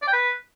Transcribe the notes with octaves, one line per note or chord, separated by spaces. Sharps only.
D5
G5
B4